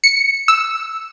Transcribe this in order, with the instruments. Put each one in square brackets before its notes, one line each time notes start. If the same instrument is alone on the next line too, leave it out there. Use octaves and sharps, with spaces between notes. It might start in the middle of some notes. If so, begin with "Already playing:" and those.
[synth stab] C#7
E6